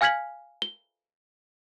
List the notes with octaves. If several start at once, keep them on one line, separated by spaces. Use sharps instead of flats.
F5 G#5 F6 G#6 B6 F#7
G7